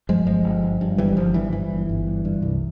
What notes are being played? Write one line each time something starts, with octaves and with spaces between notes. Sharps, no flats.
G2 F3 G#3
G1 F3 G#3
G1
G2
G2
G1 E3 G3
G1 F3
G2 E3
G2 E3
G1
G1
G2
G2
C2